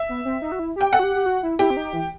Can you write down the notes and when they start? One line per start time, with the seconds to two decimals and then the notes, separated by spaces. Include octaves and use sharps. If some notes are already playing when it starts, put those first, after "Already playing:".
Already playing: E5
0.09 B3
0.25 C4
0.42 D#4
0.52 F#4
0.59 E4
0.76 G4 G5
0.93 A4 F#5
0.99 F#4
1.03 G4
1.15 G4
1.26 F#4
1.43 E4
1.59 E4 G4
1.70 C4
1.77 D#4
1.93 E3